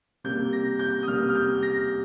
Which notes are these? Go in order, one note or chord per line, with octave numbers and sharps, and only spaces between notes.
C3 G3 A#3 G6
A#6
G6
D#6
C3 G3 A#3 F6
F6
G6
A#6